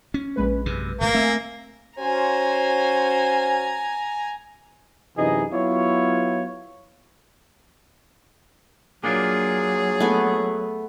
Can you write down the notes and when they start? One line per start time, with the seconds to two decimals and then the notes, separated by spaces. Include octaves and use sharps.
0.14 C#4
0.36 A#1 G#3 B4
0.66 F#2 C3
1.01 G#1 A#2 A3 A#3
1.14 A3 C4 E5 G#5
1.99 C#4 F#4 C5 G#5 A#5
5.17 F#2 C3 E3 D#4 G#4 D#5
5.52 F#3 B3 E4 F4 C#5
9.04 F#3 A#3 D4 F4 G#4
10.00 A3 B3 G#5